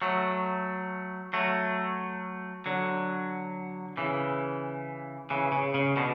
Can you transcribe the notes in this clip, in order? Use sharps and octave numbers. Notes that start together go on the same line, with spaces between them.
F#3 A3
F#3 A3
D3 F#3
C#3 E3
C#3 E3
C#3
C#3
B2 D3